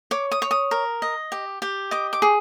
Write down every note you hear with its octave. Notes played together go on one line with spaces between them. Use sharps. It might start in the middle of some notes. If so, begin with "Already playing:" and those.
C#5 D6
D#6
C#5
D#6
A#4
D#5
G4
G4
D#5 D6
D6
G#4